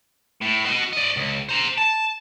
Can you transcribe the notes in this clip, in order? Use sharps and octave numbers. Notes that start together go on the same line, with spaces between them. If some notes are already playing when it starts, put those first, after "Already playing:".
A2
F#4 D#5
D5 D#5
C#2
C5 A#5
A5